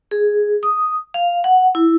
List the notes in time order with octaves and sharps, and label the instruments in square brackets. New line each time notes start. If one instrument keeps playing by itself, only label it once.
[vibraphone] G#4
D#6
F5
F#5
E4